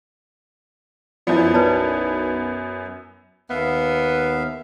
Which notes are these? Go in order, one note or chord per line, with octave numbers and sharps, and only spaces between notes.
F#2 F3 B3 E4 F#4 D5
B1 B4 D5 A5
D#2 B3 E5 F5